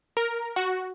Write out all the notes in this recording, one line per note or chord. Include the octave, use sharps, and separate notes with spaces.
A#4
F#4